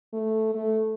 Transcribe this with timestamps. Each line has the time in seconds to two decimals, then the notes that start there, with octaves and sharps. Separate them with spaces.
0.13 A3
0.55 A3